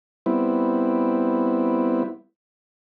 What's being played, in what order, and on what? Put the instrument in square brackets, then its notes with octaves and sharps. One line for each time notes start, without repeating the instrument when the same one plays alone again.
[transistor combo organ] G3 B3 C4 E4